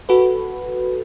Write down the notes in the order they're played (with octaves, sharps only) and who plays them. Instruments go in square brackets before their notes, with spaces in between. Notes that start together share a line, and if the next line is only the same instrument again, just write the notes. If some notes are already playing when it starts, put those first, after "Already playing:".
[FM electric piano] F#4 A4 B4